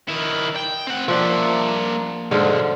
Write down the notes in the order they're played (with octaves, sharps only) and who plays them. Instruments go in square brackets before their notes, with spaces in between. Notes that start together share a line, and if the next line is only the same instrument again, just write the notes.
[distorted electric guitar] D#3 E4
G5
C4 F#5
[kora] F3 D4 [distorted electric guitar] A#3 E5
[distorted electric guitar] B1 [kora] G#2 D3